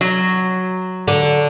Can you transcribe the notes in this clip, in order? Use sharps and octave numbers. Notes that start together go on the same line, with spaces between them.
F#3
D3